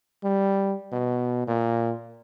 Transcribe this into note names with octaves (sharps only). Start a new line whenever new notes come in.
G3
B2
A#2